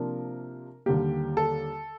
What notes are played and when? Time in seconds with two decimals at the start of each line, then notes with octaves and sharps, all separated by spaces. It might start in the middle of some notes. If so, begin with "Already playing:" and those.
Already playing: C3 F3 A#3 D4 F4 A#4
0.86 D#2 D3 G3 A#3 G4
1.37 A4